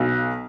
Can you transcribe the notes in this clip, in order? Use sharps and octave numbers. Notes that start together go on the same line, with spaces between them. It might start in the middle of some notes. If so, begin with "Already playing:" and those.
Already playing: B1